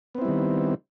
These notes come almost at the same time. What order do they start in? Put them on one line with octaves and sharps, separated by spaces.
B3 C4 E4 G3 D#3